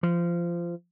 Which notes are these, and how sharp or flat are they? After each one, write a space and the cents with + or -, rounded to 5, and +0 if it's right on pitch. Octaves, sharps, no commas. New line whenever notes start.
F3 -20